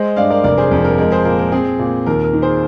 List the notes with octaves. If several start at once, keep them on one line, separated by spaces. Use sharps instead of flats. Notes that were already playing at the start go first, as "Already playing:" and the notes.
Already playing: G#3 C5 D#5
G2 D5 F5
A#4 D5
F1 A#4 D5
G#4 C5
F2
A#4
G#3 A#4
G#4 C5
A#2 A#4
A#4
C4 G#4
A#2
D#2 A#4
A#4
D#3
G#4 C5